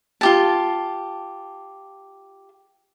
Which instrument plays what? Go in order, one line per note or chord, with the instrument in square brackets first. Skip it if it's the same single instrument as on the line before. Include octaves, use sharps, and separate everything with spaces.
[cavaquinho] F4 G4 A5